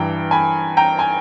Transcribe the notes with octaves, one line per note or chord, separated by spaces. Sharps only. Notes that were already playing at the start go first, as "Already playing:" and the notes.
Already playing: G2 E3 G5 A#5
G#5 B5
G5 A#5
G#5